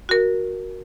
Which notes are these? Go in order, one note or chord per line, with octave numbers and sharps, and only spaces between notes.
F#4 A#4